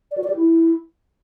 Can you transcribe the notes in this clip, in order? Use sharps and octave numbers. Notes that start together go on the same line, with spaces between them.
D5
F#4
D5
G4
E4